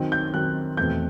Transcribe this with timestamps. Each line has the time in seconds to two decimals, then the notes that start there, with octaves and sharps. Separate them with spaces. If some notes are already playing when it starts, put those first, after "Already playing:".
Already playing: D#3 F#3 C4 D#4
0.12 G6
0.34 D#3 F#3 C4 D#4 F#6
0.77 E2 B2 A3 C4 G6